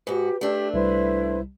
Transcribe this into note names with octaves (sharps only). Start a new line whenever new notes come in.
G#2 F#4 G4 B4
A3 D4 G4 E6
C2 G3 E4 B4 C5